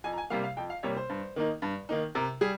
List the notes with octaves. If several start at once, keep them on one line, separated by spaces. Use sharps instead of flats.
F2 G#5
A#5
G#5
C3 G3 A#3 F5
F5
F2 G5
F5
C3 G3 A#3 C#5
C5
G2
D#3 A#3 D#4
G2
D#3 A#3 D#4
C3 A#4
G3 G#4